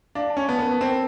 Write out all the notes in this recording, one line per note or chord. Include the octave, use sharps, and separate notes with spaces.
D4 F5
A5
C#4
B3 A5
B3 A#4
A5
C4
A#4